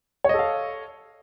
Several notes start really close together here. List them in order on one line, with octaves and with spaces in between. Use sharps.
C#5 D#5 A4 F5